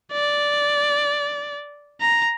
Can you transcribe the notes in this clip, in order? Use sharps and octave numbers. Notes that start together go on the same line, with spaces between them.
D5
A#5